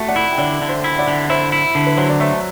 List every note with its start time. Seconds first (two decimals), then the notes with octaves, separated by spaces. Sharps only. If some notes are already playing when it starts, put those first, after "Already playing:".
Already playing: A3 F#4 A4
0.08 D5 F#5
0.16 E4
0.32 G5
0.38 D3 D5 F#5
0.62 D3
0.69 C5 E5
0.84 E4
0.99 D5 F#5
1.07 D3
1.30 E4 C5 E5
1.52 E4
1.75 D3
1.86 B4
1.97 F#3 C5
2.10 D5
2.20 A3 C5 E5